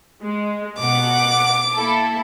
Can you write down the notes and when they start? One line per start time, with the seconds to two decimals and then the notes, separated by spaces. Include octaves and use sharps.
0.24 G#3
0.79 B2 F#5 D6
1.75 A#3 E4 A4